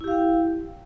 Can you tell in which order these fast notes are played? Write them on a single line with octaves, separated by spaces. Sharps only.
E4 G4 F5 G5